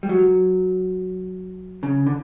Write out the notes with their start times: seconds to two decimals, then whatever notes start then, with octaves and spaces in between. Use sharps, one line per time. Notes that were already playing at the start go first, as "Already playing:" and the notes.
0.03 G3
0.09 F#3
1.83 C#3
2.06 D3